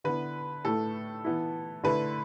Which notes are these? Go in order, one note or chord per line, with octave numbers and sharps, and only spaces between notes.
D3 B3 E4 B4
A2 A3 E4 A4
E3 B3 E4
D3 A3 E4 B4